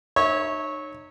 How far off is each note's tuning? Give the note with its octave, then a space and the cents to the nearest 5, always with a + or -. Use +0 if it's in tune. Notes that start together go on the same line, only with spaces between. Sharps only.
D#4 -35 C#5 -10 E5 -30